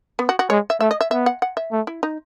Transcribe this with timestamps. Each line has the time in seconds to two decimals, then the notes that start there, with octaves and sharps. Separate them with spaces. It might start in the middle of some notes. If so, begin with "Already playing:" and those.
0.19 B3
0.29 F#4
0.39 F#4
0.50 G#3 C#5
0.70 E5
0.80 A3 E5
0.91 D#5
1.01 E5
1.11 B3 E5
1.26 F#5
1.42 F#5
1.57 E5
1.72 A3
1.87 E4
2.03 D#4